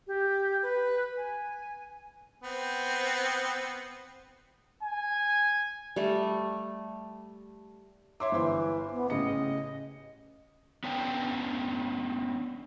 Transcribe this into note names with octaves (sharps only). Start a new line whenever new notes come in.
G4
B4
G#5
B3 C4
G#5
G3 A3
C#5 E5 C6 D6
G1 E3 C5 C6
B3
A1 C#3 D#5 C#7
B3 C#4 D4 G5